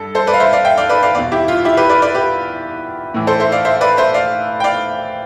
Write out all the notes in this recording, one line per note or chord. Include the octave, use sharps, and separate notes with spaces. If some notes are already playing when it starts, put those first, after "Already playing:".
Already playing: G2 A4
A4 C5
B4 D5
F5
C5 E5
D5 F5
E5 G5
D5 F5
B4 D5
D5 F5
E2 B2 D5 F5
E4 G4
F4
E4 G4
G4 B4
B4 D5
B4 D5
G4 B4
A2 E3
A4 C5
C5 E5
D5 F5
C5 E5
E5
B4 D5
C5 E5
D5 F5
G5
D5 F5